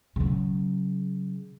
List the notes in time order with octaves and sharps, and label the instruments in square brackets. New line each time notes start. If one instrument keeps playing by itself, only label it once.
[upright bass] C#3 F#3